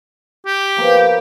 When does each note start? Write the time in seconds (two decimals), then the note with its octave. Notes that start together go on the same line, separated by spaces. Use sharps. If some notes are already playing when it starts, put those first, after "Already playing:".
0.47 G4
0.77 F3 A#3 B3